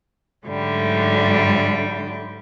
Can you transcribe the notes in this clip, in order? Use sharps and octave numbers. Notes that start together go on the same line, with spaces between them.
G#2 D3 F#3 G3 A3